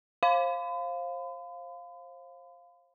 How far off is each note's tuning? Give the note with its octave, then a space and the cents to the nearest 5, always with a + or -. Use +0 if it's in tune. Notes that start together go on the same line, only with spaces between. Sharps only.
C5 +30 F5 +0 B5 +45